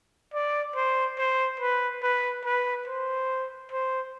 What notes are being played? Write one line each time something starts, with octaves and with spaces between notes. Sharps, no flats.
D5
C5
C5
B4
B4
B4
C5
C5